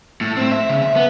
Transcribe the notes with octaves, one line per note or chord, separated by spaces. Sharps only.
A2
C4
E5
C#3
E5
B3